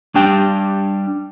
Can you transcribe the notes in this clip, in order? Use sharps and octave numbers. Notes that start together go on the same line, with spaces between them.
G3 D4 G4 G5